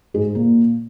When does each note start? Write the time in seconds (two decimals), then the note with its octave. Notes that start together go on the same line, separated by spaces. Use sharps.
0.14 G#2 G#3
0.35 A#2 A#3